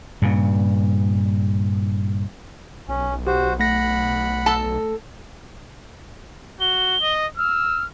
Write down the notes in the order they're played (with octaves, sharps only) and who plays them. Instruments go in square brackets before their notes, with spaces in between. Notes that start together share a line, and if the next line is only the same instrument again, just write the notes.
[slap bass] G2 A#2 C#3
[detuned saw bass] B1 [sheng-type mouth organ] C#4
[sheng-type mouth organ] F#4 C5 [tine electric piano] G4
[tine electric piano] A3 A#6 [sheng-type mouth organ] F#5 B5
[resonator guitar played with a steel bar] A4 A5
[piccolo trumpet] F#4 [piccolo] G7
[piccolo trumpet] D#5
[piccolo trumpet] E6 [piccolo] F6